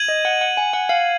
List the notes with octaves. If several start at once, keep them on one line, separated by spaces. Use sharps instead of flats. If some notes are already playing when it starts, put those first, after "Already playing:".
Already playing: G#6 D#7 F#7
D#5
F#5
F#5
G#5
F#5
F5